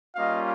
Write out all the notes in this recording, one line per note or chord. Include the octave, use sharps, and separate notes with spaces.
G3 A#3 C#4 F4 D#5 F5